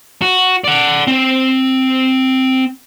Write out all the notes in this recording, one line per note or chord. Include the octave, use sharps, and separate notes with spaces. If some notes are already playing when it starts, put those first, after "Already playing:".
F#4
D5 F#5
C4